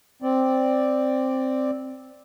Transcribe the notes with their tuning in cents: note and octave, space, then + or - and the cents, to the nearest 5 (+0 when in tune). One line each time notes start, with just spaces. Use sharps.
C4 +0 D5 +0